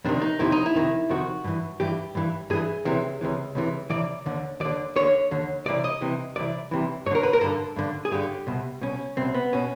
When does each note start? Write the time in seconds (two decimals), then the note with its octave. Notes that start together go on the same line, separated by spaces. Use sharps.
0.05 F2 C3 D#3 D4
0.22 D#4
0.39 F2 C3 D#3 E4
0.52 D#4
0.66 E4
0.75 F2 C3 D#3
1.09 F2 C3 D#3 F#4
1.44 G2 E3
1.80 G2 E3 G4
2.15 G2 E3
2.50 G2 E3 G#4
2.85 C#2 C3 E3
3.21 C#2 C3 E3
3.55 C#2 C3 E3
3.90 C#2 C3 E3 D5
4.26 D#2 D3
4.60 D#2 D3 D5
4.96 D#2 D3 C#5
5.31 D#2 D3
5.66 C2 C3 E3 D5
5.84 D#5
6.01 C2 C3 E3
6.36 C2 C3 E3 D5
6.71 C2 C3 E3
7.06 G2 C#5
7.11 D3 A#4
7.23 B4
7.33 A#4
7.41 G2 D3 A4
7.76 G2 D3
8.05 G#4
8.12 G2 D3 G4
8.47 C2 B2
8.81 C2 B2 C#4
9.17 C2 B2 C4
9.34 B3
9.53 B2 C#4